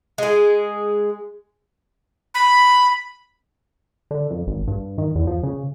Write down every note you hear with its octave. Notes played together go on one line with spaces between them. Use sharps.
G#3 G#4
B5
D3
F2
G#1
G2
D#3
E2
F3
C#3